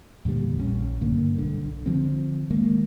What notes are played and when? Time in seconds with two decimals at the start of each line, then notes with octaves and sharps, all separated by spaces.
0.25 E2 A#2 D3 G3
0.57 A#1 C#3 C#4
1.01 G2 D3 A#3
1.38 B1 D3
1.86 D3 F3 C4
2.51 D#3 G#3 A#3